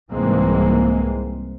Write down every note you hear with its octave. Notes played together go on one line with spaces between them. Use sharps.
C2 G#2 E3 G#3 A#3 C4